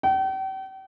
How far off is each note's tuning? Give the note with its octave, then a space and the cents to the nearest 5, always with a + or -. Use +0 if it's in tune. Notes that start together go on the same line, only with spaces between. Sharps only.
G5 -40